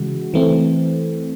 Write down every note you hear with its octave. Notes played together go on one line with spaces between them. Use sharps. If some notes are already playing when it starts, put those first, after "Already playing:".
Already playing: C#3 E3 G#3 F#4
E3 A3 C4